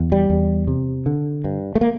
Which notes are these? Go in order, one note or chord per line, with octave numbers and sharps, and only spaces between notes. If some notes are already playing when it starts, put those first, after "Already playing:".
Already playing: E2
G3
E2
C3
D3
G2
A3
A#3